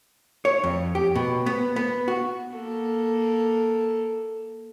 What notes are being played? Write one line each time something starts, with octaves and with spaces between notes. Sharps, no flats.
C#5
F2
G4
B2
B3
B3
F#4
A#3 A4